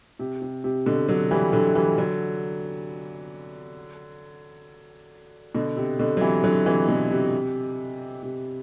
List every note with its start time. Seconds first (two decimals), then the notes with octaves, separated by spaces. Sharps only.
0.19 C3
0.42 C3
0.64 C3
0.86 B2 D3
1.08 D3 F#3
1.31 E3 G3
1.53 D3 F#3
1.75 E3 G3
1.98 D3 F#3
5.55 B2 D3
5.77 C3
5.99 B2 D3
6.17 F#3
6.21 C3 E3
6.44 D3 F#3
6.66 C3 E3
6.88 B2 D3
7.11 C3
8.23 C3